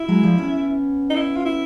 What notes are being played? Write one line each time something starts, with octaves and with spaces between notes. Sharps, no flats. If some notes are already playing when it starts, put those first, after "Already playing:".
Already playing: E4
F#3 G#3
F3 G3
B3 C#4
D#4
E4
F4
E4